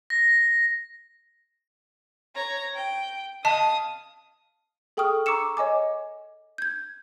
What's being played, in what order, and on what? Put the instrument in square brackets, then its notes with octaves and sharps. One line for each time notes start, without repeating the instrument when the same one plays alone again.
[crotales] A#6
[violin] C#5 A#5
G5
[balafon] D#5 A5 [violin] F5 D#6
[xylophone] G#4 A4 G5 C#6 D#6 F6
A#5 C#6 D6 E6 C#7 E7
C#5 D#5 G#5 D6
G6 G#6